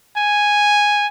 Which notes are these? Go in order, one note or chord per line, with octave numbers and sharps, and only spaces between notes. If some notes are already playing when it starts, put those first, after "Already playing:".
G#5